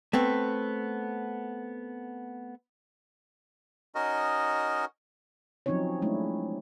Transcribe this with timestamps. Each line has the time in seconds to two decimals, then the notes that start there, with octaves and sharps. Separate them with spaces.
0.13 A3 B3 C4
3.95 C#4 D#4 F#4 A#4 D#5
5.66 F3 F#3 C4 C#4 D#4 C#5
6.02 G#3 A3 C#4 D4 E4